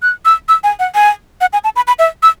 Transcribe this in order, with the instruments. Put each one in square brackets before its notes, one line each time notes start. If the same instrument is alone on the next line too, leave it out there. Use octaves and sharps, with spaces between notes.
[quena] F#6
E6
E6
G#5
F#5
G#5
F#5
G#5
A5
B5
B5
E5
E6